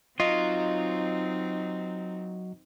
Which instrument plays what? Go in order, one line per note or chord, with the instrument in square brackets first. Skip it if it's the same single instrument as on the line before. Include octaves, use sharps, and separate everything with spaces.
[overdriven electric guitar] F#3 [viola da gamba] C4 D#4 [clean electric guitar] F4 [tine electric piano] D#5